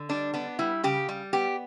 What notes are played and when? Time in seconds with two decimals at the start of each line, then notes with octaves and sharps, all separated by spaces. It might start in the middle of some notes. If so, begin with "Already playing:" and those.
Already playing: D3
0.09 G3 D4
0.33 B3 D4
0.59 G3 E4
0.83 C#3 G4
1.09 G3
1.33 B3 G4